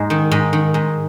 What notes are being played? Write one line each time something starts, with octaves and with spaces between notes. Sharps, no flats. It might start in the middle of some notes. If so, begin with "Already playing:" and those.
Already playing: G#2 D#5
D#3
G#2
D#3
G#2